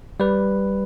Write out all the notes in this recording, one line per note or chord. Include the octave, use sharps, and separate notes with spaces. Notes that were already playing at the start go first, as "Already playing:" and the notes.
G3 B4